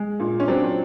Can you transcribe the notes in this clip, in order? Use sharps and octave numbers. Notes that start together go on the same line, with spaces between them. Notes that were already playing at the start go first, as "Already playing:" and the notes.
Already playing: G#3
A#2
C#4
F#3 C4 D4